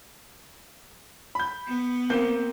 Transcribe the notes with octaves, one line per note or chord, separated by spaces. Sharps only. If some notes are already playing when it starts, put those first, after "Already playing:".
B5 G6
B3
A#3 C4 G6